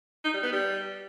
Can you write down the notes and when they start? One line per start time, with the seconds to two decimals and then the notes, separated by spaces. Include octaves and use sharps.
0.24 D#4
0.34 G3
0.43 B3
0.52 G3